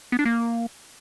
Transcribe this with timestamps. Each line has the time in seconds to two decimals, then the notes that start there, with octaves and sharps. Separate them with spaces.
0.12 B3
0.19 D4
0.25 A#3